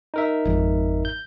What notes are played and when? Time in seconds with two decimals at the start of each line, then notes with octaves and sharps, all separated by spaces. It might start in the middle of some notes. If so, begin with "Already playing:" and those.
0.14 D#4 A#4 E5
0.45 G#1 F2
1.05 G6